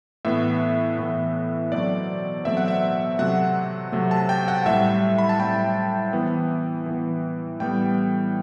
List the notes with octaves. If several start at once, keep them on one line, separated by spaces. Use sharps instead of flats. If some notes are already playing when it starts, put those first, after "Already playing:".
A2 E3 B3 E5
A2 E3 B3
B2 F#3 A3 C4 D5
B2 F#3 A3 C4 E5
F#5
E5
C3 F#3 A3 C4 F#5
C3 F#3 A3 C4
A5
G5
F#5
A2 G3 C4 E5
B5
A5
A2 G3 C4 G5
E3 B3
E3 B3
A2 G3 B3 G5